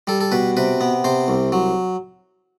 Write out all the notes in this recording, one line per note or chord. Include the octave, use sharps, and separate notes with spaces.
G3 A4
A4
B2 B4
C3 B4
B3
C3 C5
C2
F#3